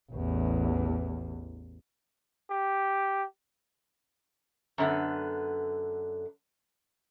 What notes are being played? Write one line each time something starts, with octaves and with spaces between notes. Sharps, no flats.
A1 E2
G4
F#2 D3 B3